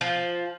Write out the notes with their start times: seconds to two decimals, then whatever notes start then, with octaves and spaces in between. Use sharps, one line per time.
0.01 F3